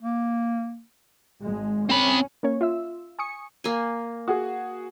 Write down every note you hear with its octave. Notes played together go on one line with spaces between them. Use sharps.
A#3
G#1 G#3
C4 C#4 B5
A#3 C#4 C#5
F4 E5 E6
G#5 C#6 D#6 C#7
A#3 G#5
F#4 G#4